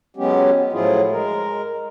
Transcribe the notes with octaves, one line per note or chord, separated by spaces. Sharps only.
F#3 G#3 B3 C#4 G4
A2 F3 F#3 E4 F4 G#4
G#3 A#4